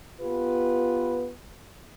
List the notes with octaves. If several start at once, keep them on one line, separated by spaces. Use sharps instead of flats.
B3 F4 G4 B4